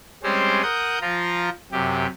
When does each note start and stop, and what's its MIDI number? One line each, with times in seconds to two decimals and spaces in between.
0.23 0.62 55
0.23 0.62 56
0.23 0.62 60
0.23 0.62 61
0.23 0.62 67
0.23 0.62 72
0.63 0.99 70
0.63 0.99 78
0.63 0.99 87
0.63 0.99 91
1.01 1.49 53
1.01 1.49 65
1.01 1.49 82
1.72 2.07 42
1.72 2.07 48
1.72 2.07 67